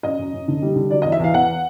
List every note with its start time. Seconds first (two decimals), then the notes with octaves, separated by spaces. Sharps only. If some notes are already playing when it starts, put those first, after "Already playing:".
0.03 F#2 D#5
0.19 F#2
0.33 F#2
0.48 D3
0.62 G3
0.76 D3
0.91 F#3 D5
1.02 D#5
1.05 E2
1.12 E5
1.19 E2 F5
1.34 E2 F#5